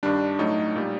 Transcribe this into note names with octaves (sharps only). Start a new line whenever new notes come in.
G2 D#3 G3 D4
A2 F#3 A3 D#4
A#2 G3